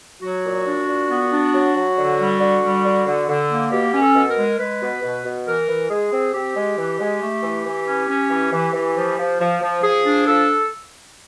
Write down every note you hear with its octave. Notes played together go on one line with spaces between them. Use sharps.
F#3 F#4
A#2
D4
A#2
B3
D4
F#3
F#3
D3
G3
D3
G3
D3
D3
D3
A#3
B2 G4
C#4
A4
B2
A#4
G#3
G#3 B4
B2
B2
B2
E3 A#4
E3
G#3 G#4
C4
C4 G4
G#3
E3
G#3
A3
E3
E3
C#4
C#4
E3
E3
E3
F3
F3
F3
F3
F3 G#4
D4
F3 A4